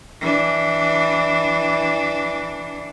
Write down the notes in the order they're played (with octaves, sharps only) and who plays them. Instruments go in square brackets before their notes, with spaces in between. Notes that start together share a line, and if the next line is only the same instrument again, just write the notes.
[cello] E3 D4